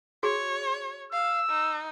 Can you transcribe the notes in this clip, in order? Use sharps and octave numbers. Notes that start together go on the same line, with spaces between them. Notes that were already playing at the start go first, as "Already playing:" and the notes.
F#4 G#4 C#5
F5 E6
D#4